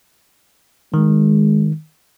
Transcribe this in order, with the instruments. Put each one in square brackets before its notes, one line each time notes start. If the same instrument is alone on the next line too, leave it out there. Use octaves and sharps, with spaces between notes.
[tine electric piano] D#3 [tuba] G#3